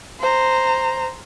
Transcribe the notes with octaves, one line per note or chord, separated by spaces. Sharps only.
C5 A#5